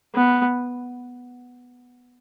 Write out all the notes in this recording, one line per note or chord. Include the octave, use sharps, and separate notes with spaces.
B3